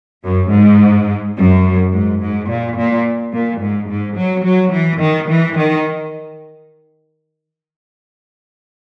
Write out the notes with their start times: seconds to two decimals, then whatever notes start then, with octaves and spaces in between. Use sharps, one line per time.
0.24 F#2
0.52 G#2
1.37 F#2
1.92 G#2
2.20 G#2
2.48 A#2
2.76 A#2
3.33 A#2
3.61 G#2
3.89 G#2
4.16 F#3
4.44 F#3
4.73 E3
5.01 D#3
5.29 E3
5.56 D#3